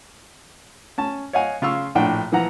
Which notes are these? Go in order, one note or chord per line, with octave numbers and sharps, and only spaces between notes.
C#4 A5
C#5 D#5 F5 F#5 G#5
C#3 F4 F5 C#6 E6
A#1 A2 D4 F#5 G5
A#2 E3 F3 F#5 A#5